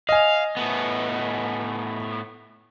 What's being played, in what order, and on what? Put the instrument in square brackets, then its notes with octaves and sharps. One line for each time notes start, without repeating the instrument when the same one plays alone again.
[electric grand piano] D#5 G#5 [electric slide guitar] F5
[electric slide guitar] A2 A3 B3